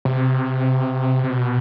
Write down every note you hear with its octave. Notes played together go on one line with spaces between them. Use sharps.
C3
C3
B2